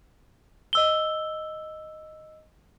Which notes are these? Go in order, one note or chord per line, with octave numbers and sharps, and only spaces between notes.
D#5 E6 G7